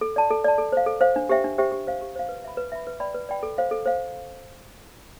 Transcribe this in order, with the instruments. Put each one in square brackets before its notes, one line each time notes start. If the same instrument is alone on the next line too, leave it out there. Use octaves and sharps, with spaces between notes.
[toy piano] A4
D5 A5
A4
D5 A5
A4
C5 F5
A4
C5 F5
D4
G4 C5 E5 G5
D4
G4 C5 E5 G5
G4
C5 F5
G4
C5 F5
B4
E5 B5
B4
E5 B5
B4
D5 G5 B5
B4
D5 G5 B5
A4
C5 F5
A4
C5 F5